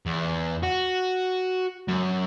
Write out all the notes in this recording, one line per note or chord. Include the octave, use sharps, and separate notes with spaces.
E2
F#4
F#2